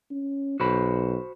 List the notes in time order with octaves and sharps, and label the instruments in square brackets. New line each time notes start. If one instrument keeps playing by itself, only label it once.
[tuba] C#4
[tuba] B1 [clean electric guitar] F#4 C5 B5